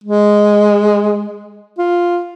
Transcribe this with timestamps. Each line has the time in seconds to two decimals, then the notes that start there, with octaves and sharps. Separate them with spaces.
0.04 G#3
1.78 F4